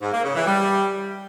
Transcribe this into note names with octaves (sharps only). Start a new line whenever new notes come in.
G#2
A#3
C#3
E3
G3